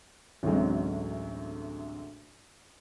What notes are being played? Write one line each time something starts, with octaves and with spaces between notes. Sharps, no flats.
A1 D2 A2 C3 F#3 G#3